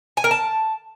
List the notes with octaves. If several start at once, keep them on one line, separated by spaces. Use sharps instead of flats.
G#5
A#4
A5